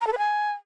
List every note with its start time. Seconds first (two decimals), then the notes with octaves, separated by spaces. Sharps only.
0.01 A#5
0.07 A4
0.12 B4
0.18 G#5